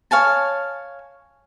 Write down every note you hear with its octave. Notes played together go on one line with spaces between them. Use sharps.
C#5 F5 G#5 A5